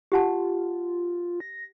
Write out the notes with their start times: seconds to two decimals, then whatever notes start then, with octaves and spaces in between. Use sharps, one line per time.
0.12 F4 G4 F#5 A5
1.40 A#6